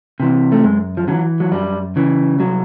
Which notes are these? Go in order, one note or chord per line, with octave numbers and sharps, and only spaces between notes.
C3 E3
A3
F#2 G#3
F3
C#3 E3 F#3
F#3
F#2 G3
C#3 E3
C2 F#3